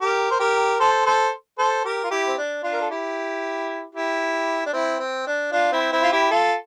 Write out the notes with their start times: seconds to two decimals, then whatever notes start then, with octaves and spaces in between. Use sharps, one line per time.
0.01 G4 A#4
0.31 C5
0.40 G4 A#4
0.80 A4 C5
1.05 A4 C5
1.59 A4 C5
1.85 G4 A#4
2.04 F4
2.11 E4 G4
2.28 C4
2.38 D4
2.63 D4 F4
2.73 A#4
2.81 A4
2.90 E4 G4
3.94 E4 G4
4.66 D4
4.73 C4 E4
4.99 C4
5.27 D4
5.52 D4 F4
5.72 C4 E4
5.92 C4 E4
6.03 F4
6.12 E4 G4
6.31 F4 A4